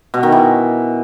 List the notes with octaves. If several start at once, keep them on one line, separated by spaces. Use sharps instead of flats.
B2
D#3
E3